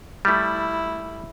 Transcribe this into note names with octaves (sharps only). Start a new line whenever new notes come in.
G3 A3 E4